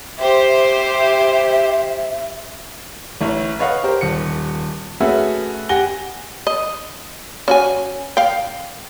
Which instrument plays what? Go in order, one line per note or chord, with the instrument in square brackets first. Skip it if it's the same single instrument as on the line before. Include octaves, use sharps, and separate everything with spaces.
[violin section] G4 C5 [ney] E5
[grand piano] A1 E4 C#5
B4 C#5 D#5 F5 F#5
G4 A#4 C5
D#1 C#7
A3 C#4 F#4 G#4 B4 E5
G4 F#5 G#5 A#6 G7
[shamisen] D#5
C#4 F#4 G#5
F5 G5